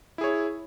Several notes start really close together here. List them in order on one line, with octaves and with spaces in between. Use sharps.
E4 G#4 C#5